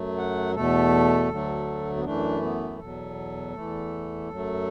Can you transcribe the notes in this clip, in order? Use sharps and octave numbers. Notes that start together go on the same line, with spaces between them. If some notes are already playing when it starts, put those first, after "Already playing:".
Already playing: F#2 F#3 A3
F#5
E2 B2 A3 A4
D2 D3 F#3 A3
B3
F#2 E3 A3 D4
B3
E2 B2 F#3 A4
E2 E3 A3
F#2 F#3 A3